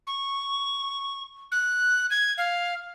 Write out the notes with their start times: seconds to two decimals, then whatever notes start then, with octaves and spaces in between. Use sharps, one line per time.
0.07 C#6
1.52 F#6
2.10 G#6
2.38 F5